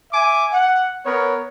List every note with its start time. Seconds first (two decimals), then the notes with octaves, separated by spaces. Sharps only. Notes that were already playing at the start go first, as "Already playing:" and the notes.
0.12 E5 G#5 D6
0.53 F#5
1.05 B3 A#4 C#5